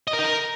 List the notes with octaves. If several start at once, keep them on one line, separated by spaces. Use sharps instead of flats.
D#5
A#4
D#4
A#4